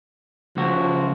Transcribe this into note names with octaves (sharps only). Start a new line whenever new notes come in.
C#2 F3 F#4